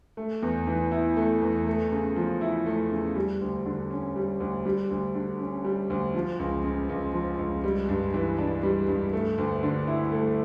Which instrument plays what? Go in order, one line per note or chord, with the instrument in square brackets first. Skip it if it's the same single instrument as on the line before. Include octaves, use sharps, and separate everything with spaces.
[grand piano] A3
E2
E3
E4
A3
E2
A3
C#3
F3
E4
A3
C#3
G3
D2
D3
C#4
G3
D2
G3
D2
D3
C#4
G3
D2
F3
C#2
C#3
C#2
F3
C#2
G3
G2
E3
D4
G3
G2
A3
D2
D3
E4
A3